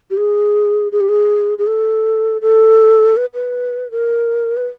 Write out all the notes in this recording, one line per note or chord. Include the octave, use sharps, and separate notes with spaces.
G4
G#4
G#4
G4
G#4
G#4
A4
A4
B4
B4
A#4
B4